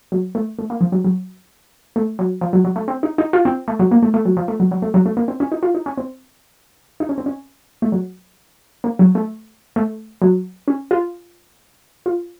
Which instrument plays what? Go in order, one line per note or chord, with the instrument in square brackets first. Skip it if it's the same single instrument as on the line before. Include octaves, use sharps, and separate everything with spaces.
[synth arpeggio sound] F#3
A3
A3
A#3
F3
F#3
F#3
A3
F#3
F3
F#3
F#3
A3
C4
D#4
D#4
F4
C4
A3
F#3
A#3
A3
A3
F#3
F3
A3
F#3
F#3
A3
F#3
A3
A#3
C4
C#4
D#4
F4
D#4
C#4
C4
D#4
C#4
C4
C#4
A3
F#3
A#3
F#3
A3
A3
F#3
C#4
F4
F4